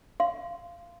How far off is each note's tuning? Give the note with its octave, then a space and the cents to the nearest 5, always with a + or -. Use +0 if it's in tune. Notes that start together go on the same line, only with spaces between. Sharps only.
F5 -15 C6 -15